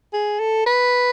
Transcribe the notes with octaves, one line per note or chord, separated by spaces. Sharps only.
G#4
A4
B4